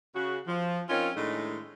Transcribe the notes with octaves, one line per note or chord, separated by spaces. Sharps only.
C#3 F#4
F3
C4 C#4 D#4 F4 A#4 C#5
A2 D#3 G#3 A3 D4 D#4